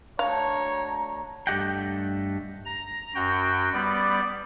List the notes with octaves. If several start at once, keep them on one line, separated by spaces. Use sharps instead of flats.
A3 D4 F#4 C#5 F5 A#5
G2 A3 G4 D#5 F#5 G5
A#5
F#2 F#4 G5
G3 B3 D5